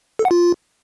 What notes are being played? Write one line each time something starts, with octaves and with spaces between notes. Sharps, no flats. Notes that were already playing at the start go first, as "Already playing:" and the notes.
A4
F#5
F4